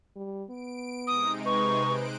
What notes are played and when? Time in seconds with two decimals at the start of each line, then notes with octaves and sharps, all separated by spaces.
0.16 G3
0.50 B3 D7
1.07 C3 G#3 D#4 D#6
1.46 B4 C#6
1.85 B4 C5 F#6 D7